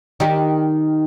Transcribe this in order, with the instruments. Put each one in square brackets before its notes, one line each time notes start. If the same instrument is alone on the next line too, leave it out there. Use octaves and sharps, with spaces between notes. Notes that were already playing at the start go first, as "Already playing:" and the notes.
[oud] D#3 D#4 G4